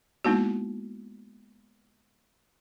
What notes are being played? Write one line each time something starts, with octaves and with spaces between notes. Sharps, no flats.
G#3 A#3 B3 D#4 E4 F#4